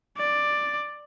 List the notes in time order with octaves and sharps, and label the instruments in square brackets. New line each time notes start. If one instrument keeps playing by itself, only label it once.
[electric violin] D5